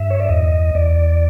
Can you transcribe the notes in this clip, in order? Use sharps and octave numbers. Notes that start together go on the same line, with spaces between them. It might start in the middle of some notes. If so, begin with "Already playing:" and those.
Already playing: G2 E5
C#5
D5
E2 D#5
E2 D5